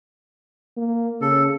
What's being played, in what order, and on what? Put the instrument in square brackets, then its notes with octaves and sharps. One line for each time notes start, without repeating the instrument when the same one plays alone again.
[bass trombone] A#3
[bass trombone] C#3 [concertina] A4